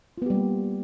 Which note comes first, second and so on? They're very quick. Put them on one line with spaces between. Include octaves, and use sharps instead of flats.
F4 B3 G4 G3 A#3